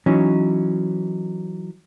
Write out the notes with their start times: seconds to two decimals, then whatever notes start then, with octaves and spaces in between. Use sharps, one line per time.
0.06 E3 F#3 C#4 D#4